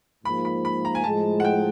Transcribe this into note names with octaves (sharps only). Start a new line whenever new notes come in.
G#2 F3 A#3 B5
B5
B5
A#5
G#5
A2 F3 G#3 A5
F#5
G5